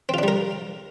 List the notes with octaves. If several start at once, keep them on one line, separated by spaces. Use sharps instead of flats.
G3 C4 D4 F4 A#4